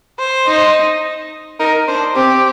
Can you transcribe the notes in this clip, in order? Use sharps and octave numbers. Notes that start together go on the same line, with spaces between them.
C5
D#4
D#4 A#4
D4 C5
C4 G4